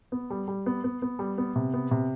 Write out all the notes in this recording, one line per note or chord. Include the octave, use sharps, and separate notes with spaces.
B3
G3
G3
B3
B3
B3
G3
B3
C3
B3
C3